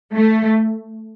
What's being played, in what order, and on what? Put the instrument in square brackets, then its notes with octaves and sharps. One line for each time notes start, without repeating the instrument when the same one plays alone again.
[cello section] A3